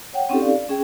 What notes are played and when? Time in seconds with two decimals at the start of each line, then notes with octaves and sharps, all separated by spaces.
0.14 C#5 F#5 G5
0.29 C4 C#4 D#4 G4 A4
0.41 D5 F5
0.69 C#4 G#4 G5